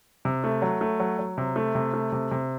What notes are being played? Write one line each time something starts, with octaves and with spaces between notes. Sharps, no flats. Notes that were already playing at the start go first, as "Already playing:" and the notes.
C3
A3
F#3
A3
F#3
F#3
C3
A3
C3
A3
C3
C3